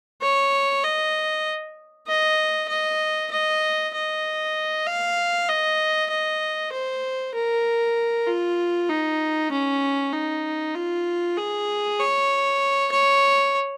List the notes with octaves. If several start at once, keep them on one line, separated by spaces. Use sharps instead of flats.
C#5
D#5
D#5
D#5
D#5
D#5
F5
D#5
D#5
C5
A#4
F4
D#4
C#4
D#4
F4
G#4
C#5
C#5